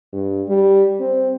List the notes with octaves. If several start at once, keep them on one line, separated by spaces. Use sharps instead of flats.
G2
G3
C4